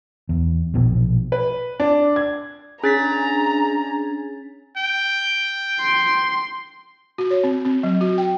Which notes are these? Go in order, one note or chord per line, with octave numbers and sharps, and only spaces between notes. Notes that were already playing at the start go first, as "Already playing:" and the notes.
E2
A#1 B2 F3
B4
D4
G#6
C#4 D4 G#4 A#5 A6 B6
G5
C6
F#4
C#5
C4
C4
F#3
F#4
G5